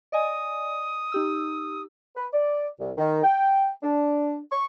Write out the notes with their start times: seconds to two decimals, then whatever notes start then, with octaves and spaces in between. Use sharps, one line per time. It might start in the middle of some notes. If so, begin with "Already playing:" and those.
0.12 D5 D#5 G#5 D#6
1.12 D#4 G4 E6
2.16 B4
2.33 D5
2.79 C2
2.98 D#3
3.24 G5
3.83 D4
4.51 C#6